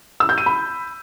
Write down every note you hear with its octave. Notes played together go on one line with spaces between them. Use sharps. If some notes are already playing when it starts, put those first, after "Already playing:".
E6
G6
D#7
B5